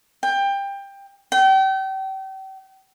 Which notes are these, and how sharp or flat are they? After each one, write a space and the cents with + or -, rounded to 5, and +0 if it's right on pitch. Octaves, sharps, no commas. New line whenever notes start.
G5 +20
G5 -35